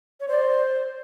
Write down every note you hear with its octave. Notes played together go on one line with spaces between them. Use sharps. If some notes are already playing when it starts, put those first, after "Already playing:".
C#5
C5 D5